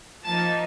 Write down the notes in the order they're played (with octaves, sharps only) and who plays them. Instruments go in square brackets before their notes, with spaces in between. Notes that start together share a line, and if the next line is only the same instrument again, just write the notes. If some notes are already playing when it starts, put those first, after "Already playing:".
[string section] F3 A#3 D#4 A5